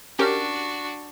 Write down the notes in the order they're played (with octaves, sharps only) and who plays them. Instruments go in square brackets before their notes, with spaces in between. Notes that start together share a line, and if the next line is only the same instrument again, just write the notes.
[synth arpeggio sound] C#4 G4 A#4 [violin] D4 F#4